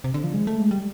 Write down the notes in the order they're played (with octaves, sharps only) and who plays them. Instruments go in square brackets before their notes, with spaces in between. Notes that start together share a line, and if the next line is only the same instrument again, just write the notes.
[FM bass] C3
D3
F3
G#3
A3
G#3
G3